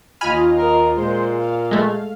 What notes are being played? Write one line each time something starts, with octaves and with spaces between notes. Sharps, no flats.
D#2 F4 D#5 G#5 B5 F6
A#4
A#2 G#3 C5 C6
F5
G#3 A3